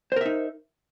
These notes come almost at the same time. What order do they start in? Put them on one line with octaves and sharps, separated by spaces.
C5 A#4 E5 D#4